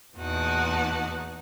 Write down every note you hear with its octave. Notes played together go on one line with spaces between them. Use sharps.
E2 A#2 D#4 F#4 F#5 A5